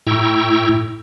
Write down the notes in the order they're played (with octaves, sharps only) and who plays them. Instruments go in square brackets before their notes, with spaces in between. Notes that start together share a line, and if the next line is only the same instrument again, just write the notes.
[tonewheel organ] A2 E4 G5 A#5 C#6 E6